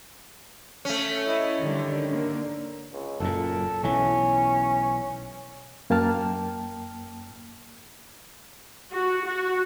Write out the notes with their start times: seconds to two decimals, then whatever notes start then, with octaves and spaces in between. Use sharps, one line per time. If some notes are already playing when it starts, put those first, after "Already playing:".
0.85 A3 C#4
1.27 E4 D#5
1.59 D3 D#3 G3
2.09 D3 A#3
2.94 C#2
3.20 F#1 F#2 A#2 A4
3.83 B1 B2 E3 C#4
5.90 F#2 A#3 G5 A5 F6
8.93 F#4
9.26 F#4